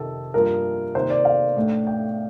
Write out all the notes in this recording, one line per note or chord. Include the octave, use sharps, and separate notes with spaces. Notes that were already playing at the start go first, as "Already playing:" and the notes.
Already playing: F2 C3 D#3 A4
G2 F3 A#3 F4 A#4
C3 D#3 A#3 D#4 C5
D5
F5
A2 A3 D4
G5